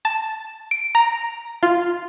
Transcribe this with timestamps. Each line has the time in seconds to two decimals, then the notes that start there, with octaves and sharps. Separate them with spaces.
0.05 A5
0.71 D7
0.95 A#5
1.63 F4